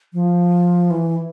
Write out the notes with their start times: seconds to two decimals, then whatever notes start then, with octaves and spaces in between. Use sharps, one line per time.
0.13 F3
0.90 E3